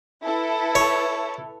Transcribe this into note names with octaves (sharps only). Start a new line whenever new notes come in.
E4 A4 B4
C#5